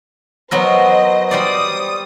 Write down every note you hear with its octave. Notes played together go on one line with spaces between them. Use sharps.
F#3 B3 A#4 C5 D#5
G3 C5 D5 D#6